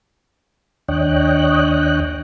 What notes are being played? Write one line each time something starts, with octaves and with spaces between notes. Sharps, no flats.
D#2 D4 C#5 D#5 G5 F#6